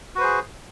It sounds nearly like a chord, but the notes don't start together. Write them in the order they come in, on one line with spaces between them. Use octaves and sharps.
F#4 B4 C5 G#4